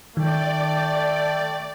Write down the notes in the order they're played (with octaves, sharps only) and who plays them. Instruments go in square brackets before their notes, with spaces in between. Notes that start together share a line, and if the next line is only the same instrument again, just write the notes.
[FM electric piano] D#3 [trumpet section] A3 G5 [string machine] D5